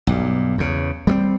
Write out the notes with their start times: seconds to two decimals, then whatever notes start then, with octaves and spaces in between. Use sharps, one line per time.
0.07 B1 G2
0.58 E2 C#3
1.07 G3 A3 C4